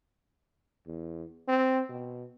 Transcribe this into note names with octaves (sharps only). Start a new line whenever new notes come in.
E2
C4
B2